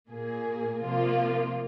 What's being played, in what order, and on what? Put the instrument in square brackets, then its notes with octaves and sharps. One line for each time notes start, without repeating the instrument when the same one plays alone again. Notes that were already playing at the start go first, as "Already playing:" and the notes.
[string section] A#2 A#3 G#4
C3 F3 A#3 F4